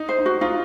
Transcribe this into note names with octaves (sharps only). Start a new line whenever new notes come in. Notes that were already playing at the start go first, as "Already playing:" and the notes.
Already playing: D#4
C5
D#4
F#4
D#4 F4